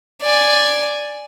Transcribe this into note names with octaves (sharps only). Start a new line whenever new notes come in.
D5 G#5